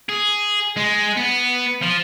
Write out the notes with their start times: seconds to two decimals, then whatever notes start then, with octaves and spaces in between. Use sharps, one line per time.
0.09 G#4
0.77 G#3
1.17 B3
1.82 F3